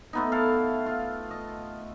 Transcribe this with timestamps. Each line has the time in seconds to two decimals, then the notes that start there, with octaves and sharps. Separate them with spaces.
0.13 A3 B3 D#4
0.32 E4 A4 F5
0.86 F4
1.31 D#5